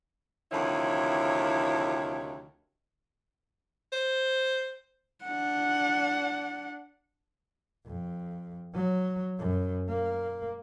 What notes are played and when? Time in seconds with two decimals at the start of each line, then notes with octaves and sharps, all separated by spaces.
0.52 D2 C3 D#3 F3 E4 C#5
3.92 C5
5.24 D4 F#5
7.86 F2
8.74 F#3
9.39 F#2
9.89 A#3